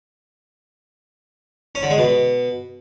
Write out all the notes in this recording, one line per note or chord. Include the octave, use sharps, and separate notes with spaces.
C#4
D3
G#3
B2